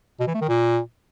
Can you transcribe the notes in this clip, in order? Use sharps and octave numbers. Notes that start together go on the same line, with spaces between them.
B2
E3
A3
D#3
A#2